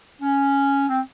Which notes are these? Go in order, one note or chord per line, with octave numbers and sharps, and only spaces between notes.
C#4
C4